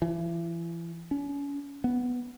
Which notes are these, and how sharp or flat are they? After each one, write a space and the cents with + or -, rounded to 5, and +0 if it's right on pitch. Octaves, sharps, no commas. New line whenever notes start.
E3 +35
C#4 +35
B3 +0